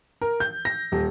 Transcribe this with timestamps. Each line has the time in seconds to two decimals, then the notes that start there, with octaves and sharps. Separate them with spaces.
0.22 A#4
0.40 G6
0.65 A#6
0.92 D#1